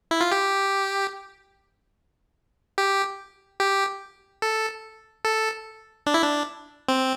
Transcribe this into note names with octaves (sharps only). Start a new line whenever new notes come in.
E4
F4
G4
G4
G4
A4
A4
D4
E4
D4
C4